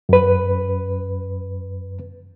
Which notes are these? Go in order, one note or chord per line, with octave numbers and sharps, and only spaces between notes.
F#2 B4